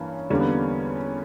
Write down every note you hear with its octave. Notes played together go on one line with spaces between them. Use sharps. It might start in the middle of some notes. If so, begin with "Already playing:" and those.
Already playing: G2 E3 A#3 C#4
E2 D3 G3 A#3 C#4
B3